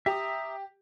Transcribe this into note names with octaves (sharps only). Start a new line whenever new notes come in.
G4 E5 A#5 D#6